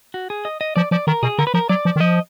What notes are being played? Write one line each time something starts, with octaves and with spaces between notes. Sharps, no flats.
F#4
G#4
D#5
D#5
F3 D5
F3 D5
D#3 A#4
B2 G#4
D3 A#4
B4
F3 A#4
F#3 D5
F3
D#3
F3 D#5